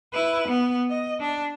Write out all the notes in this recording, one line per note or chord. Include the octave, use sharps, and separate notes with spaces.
E4 B4
B3
D#5
D4